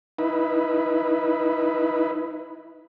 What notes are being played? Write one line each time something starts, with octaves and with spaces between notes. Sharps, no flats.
D#4 E4 B4